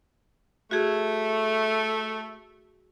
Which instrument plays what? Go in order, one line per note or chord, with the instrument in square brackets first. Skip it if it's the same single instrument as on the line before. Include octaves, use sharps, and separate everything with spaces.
[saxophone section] A3 [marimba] F#4 G#4